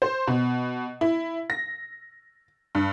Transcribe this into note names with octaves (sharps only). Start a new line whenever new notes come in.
C5
B2
E4
A#6
G2